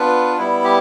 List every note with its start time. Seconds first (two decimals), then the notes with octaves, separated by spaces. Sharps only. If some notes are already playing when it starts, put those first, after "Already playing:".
Already playing: B3 D4 F4 B4
0.38 G3 B3 E4
0.64 G4